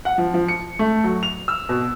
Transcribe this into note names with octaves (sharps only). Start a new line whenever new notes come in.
F#5
F3
F3
C#7
A3
F#3
F7
E6
B2